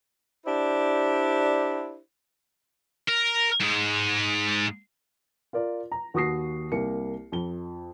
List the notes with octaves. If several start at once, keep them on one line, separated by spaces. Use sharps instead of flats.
D4 E4 G4 C5 D5
A#4
G#2 G#3
F4 A#4 D5
A#5
D#2 F#4 C#6 D#6 A#6 C7
C2 A#3 C#7
F2 G7